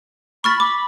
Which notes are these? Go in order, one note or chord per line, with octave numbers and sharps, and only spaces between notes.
B5 C#6 F6 A6
B5 D6